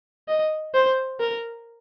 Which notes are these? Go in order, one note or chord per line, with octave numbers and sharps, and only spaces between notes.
D#5
C5
A#4